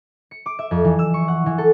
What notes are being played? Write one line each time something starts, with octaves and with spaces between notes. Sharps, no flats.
C#7
D6
E5
F2
E3
E6
C#6
F#5
E3
A4